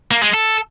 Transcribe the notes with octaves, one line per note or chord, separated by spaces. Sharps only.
A#3
G#3
A4